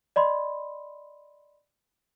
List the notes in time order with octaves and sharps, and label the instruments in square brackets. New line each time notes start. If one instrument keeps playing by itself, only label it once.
[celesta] D5 D#5 B5 C6